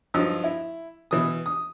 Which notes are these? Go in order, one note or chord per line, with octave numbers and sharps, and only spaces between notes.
G2 F3 F#3 D#4 E6
E4
B2 E3 D#6
D#6